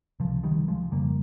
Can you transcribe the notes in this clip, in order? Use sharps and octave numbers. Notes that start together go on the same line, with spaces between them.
C#2 C3 F3
D#3 G3
F3 G#3
F2 C#3 G3 A#3